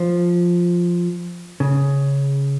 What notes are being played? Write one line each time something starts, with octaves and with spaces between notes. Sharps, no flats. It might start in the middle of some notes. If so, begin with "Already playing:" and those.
Already playing: F3
C#3